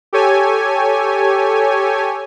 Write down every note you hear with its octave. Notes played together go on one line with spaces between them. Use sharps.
G4 A4 C#5 G#5